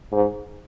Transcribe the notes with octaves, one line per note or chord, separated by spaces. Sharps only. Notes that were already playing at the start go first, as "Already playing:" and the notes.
G#2